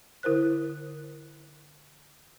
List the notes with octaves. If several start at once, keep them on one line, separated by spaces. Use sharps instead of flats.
D3 E4 A#4 C5 F#6